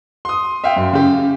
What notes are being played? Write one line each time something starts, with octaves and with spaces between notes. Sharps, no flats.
C6 D#6
E5 F5 G5
F#2
C#3 G4